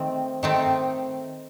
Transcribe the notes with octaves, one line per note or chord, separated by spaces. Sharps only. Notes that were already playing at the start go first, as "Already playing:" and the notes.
Already playing: D#3 A3 C4
D#3 A3 C4